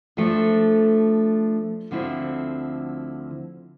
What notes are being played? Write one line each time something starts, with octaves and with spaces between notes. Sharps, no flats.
F3 A3 D4 A4
D2 D3 F3 C4 E4